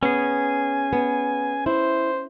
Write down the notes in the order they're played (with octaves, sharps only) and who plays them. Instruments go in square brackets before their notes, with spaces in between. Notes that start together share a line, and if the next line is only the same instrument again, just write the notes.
[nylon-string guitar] B3 [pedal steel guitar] C#4 G#4 [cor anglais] G#5
[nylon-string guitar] B3
[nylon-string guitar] E4 [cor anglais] C5